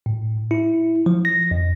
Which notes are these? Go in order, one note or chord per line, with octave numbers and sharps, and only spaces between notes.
A2
E4
F3
A#6
F2